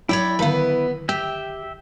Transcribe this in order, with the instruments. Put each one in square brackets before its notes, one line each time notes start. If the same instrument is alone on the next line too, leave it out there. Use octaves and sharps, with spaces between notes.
[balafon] F#3 [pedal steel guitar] E4 B5 [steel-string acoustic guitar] C#5 D5 G5
[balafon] D3 D#3 F5 [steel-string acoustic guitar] B3 B4
[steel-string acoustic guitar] G4 [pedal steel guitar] E5 G5